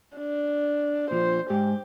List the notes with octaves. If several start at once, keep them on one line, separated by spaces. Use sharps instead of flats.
D4
A#2 F3 C5
G#2 G4